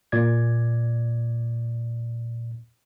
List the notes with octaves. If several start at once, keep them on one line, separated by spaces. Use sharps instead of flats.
A#2 D5 G#6